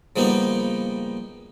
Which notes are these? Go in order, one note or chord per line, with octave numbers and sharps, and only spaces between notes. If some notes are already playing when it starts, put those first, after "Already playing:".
C#3 F3 G3 A#3 B3 D#4